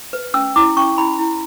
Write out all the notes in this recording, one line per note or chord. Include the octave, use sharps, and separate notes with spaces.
B4
C#4 E6
E4 D6
C#4 C#6
E4 B5
E4